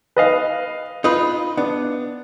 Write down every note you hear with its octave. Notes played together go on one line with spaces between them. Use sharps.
B4 D#5 F5
D#4 F4 B4 D#6
B3 D4